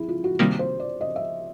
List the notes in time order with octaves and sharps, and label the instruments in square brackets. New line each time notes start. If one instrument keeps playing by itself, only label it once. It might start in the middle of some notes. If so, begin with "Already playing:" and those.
Already playing: [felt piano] E4 G#4
F4
F#4
[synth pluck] C3 D#3 G3 A#3 [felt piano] G4
[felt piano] C5
D5
D#5
E5